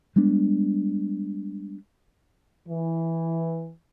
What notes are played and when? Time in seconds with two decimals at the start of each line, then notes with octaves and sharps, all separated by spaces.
0.16 G3 G#3 B3 D4
2.68 E3